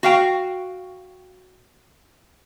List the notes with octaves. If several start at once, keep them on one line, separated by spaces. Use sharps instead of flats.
F#4 F5 G5